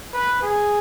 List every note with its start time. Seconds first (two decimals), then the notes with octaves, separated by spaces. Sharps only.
0.13 B4
0.43 G#4